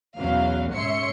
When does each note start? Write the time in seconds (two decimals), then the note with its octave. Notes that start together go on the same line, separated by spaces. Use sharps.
0.18 B1 E2 F#3 C#4 F5
0.72 G#2 C#4 C#5 E5 C6 C#7